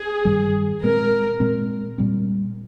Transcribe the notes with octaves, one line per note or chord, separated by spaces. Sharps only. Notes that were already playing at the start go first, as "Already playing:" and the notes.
Already playing: G#4
G2 D#3 G3 C#4
A#2 G#3 C4 A#4
A#2 G#3 C4
A#2 G3 C4